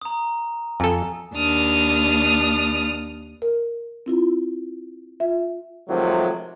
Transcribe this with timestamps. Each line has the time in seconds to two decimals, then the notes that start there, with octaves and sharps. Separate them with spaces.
0.02 A#5 D#6
0.80 F2 A4 G#5
1.34 D#2 D4 D#6 F6
3.42 A#4
4.06 C4 E4 F4
5.20 F4 E5
5.89 C3 D#3 F3 F#3 G#3 A3